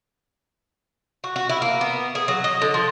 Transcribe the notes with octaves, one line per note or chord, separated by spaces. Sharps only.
F#4
F#4
E4
A#3
B3
G#4
F#3
D#5
D3
F3